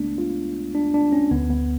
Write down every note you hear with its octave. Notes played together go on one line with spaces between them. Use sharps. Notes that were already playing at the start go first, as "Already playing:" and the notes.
Already playing: C#2 C#3 G#3 A3 B3 D4
F4
D4
D4
C#4
D2 D3 B3
B3